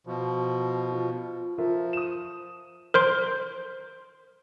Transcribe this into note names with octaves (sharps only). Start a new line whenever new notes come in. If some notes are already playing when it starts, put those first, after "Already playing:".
B2 F3
F4
F3 F4 A#4 E5
D#6 E7
A#4 C5 C6